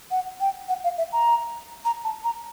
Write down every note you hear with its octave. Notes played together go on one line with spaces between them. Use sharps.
F#5
G5
F#5
F5
E5
A#5
A#5
A5
A#5